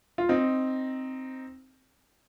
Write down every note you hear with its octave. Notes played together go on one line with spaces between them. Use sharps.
F4
C4 D#4